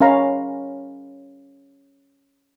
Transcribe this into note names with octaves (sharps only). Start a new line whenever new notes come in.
C#4 A#4 F5 A#5 B5